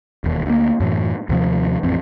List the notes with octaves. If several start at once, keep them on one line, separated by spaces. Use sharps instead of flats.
E1 D#2
D2 A#3
F#2 A2 E3
D#2 C3 F3
A1 F2 C4